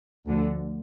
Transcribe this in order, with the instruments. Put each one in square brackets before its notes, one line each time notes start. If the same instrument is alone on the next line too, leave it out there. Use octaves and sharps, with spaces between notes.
[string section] D2 D3 F3